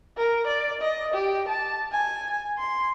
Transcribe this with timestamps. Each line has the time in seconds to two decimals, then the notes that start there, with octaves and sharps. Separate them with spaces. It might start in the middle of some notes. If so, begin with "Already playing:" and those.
0.17 A#4
0.47 D5
0.81 D#5
1.14 G4
1.48 A5
1.92 G#5
2.58 C6